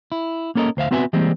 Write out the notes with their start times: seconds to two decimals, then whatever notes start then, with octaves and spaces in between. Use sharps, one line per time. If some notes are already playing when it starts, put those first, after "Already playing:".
0.12 E4
0.55 A#3 C#4 A4 A#4 D#5
0.77 D2 C5 E5 F5
0.91 B3 C4 F#4 B4 E5 G#5
1.13 E3 G3 G#3 A#3 C4